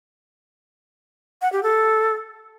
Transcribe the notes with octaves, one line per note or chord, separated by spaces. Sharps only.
F#5
G4
A4